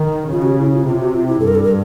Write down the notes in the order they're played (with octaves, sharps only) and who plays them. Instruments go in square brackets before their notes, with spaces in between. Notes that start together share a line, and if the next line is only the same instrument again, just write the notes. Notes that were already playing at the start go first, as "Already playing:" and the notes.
Already playing: [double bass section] D#3
[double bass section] C#3 [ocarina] F4
[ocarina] F#4
G4
E4
F4
[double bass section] C3 [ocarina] F4
[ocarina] F#4
F4
E4
[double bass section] G2 [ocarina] A4
[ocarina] A#4
A4
A#4